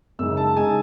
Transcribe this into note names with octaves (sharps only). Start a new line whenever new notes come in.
F#2 C#3 G#3 D#4 E6
A5
C#3 G#3 D#4 G#5